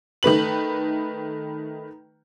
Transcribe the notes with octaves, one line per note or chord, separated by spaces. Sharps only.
D#3 A3 B4 F#7